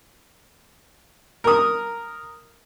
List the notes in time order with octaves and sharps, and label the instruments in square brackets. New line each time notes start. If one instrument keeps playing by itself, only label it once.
[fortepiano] A#4 D#6